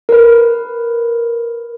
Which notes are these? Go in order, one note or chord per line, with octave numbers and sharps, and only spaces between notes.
A#4 B4